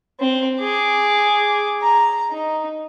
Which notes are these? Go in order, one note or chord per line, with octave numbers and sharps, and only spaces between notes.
C4
G#4 D6
A#5
D#4